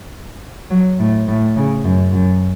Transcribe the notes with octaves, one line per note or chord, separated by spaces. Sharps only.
F#3
A2
A2
C#3
F#2
F#2